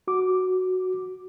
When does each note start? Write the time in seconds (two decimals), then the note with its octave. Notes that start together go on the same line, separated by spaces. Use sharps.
0.08 F#4 D6